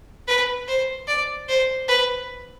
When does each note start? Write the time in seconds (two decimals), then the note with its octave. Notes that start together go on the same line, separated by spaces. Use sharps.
0.27 B4
0.68 C5
1.07 D5
1.48 C5
1.88 B4